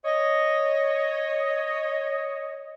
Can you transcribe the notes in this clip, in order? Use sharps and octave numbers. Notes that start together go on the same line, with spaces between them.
C#5 D#5